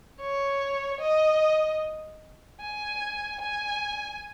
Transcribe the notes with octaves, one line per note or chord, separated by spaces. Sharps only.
C#5
D#5
G#5
G#5